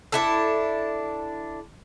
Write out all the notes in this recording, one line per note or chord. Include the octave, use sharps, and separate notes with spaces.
D4 E4 A4